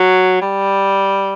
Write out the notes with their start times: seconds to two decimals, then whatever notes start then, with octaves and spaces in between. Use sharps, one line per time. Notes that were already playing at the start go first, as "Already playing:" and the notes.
Already playing: F#3
0.41 G3